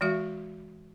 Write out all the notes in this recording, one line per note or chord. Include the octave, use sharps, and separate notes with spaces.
E3 G#3 F#4 E5